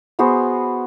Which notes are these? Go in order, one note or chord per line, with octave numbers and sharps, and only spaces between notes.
B3 F#4 G#4 C5